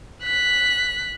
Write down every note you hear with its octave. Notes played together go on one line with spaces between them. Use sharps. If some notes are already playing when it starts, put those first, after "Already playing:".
F#6 B6